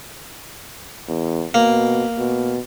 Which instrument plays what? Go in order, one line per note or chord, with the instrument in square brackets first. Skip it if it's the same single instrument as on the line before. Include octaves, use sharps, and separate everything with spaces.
[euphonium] E2
[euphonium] B2 [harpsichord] A#3
[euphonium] B2